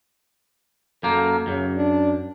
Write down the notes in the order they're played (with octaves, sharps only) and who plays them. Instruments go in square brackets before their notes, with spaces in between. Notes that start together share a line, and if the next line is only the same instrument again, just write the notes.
[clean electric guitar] F#2 A#3 [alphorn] A4
[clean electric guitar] F#2 [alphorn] C#3
[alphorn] D4